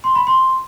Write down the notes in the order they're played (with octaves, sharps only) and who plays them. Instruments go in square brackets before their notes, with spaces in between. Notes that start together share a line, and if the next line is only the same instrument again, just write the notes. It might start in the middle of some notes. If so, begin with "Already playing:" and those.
[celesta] C6
B5
C6